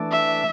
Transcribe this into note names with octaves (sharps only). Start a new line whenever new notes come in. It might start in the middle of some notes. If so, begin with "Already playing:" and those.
Already playing: E3 A3 D4
E5